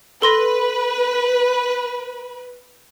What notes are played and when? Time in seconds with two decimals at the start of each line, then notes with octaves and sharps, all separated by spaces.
0.22 A4 B4 C6 A#6